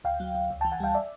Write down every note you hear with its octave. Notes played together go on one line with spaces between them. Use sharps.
D2 F5 G5
F#3
D2
C#2
G5 A5
E3
F#5 G#5
G3 F5 G5
D5 E5